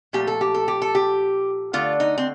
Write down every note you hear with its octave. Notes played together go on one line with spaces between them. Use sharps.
A#2 F3 A3 G4
A4
G4
A4
G4
A4
G4
D3 A3 F4
D#4
C4